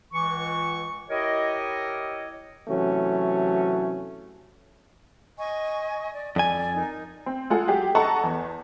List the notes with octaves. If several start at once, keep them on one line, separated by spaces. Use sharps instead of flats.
C#2 E3 C#6
E4 G4 A#4 C#5 D#5
C3 E3 F#3 A3 C#4 F#4
D#5 G#5 C#6
D5
F2 D5 G#5
D#4 A#4
C4
G#3 F4 A4 F#5 G#5
F#3 G4 G#4
A4 D#5 F#5 A5 A#5 C#6
E2